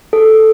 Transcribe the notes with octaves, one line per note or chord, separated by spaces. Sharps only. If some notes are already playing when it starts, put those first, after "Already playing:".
A4